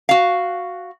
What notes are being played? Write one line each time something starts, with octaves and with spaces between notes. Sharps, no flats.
F#4 F5